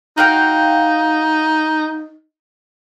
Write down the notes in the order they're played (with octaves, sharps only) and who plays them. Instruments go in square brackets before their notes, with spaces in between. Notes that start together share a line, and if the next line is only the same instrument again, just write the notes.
[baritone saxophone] D#4 [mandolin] F#4 F5 G5